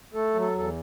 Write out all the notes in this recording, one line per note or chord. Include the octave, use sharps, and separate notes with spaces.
A3 A4
F#3
A4
E2 A4